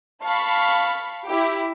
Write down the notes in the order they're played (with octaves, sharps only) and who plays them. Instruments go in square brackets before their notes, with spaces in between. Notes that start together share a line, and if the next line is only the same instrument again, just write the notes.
[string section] F5 A5 B5 C#6
E4 G4